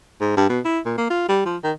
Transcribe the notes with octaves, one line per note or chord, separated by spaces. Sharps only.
G#2
G2
B2
E4
A#2
A#3
F4
G3
F3
D#3